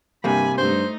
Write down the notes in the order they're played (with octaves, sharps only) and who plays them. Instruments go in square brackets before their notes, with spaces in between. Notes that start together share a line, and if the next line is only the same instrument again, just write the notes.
[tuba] G2 [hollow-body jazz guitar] C3 G3 A#3 [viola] G#5 B5
[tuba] G2 [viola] A3 D#4 [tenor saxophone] C5